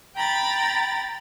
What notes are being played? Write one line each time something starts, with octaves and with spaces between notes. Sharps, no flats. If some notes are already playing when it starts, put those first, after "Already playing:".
G5 A#5 B5 A6